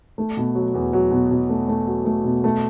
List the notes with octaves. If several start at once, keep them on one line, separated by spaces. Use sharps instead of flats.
A3
B2
F#3
E2
F#3
B2
B2
A3
A3
F#3
A3
B2
A3